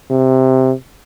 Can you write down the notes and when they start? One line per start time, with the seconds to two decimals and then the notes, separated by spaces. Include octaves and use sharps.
0.10 C3